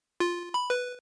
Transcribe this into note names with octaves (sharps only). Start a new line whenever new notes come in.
F4
B5
B4